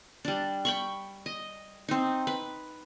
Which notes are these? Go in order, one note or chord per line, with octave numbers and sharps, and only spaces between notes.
G3 D4
G5 B5 C#6
D#5
C4 D#4
B4